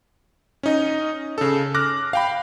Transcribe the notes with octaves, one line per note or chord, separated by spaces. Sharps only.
C#4 D#4 D#5
C#3 A4
D6 F6 F#6 A#6
F5 G5 B5